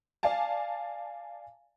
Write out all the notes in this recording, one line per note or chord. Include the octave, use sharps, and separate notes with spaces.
D5 F5 G#5 A5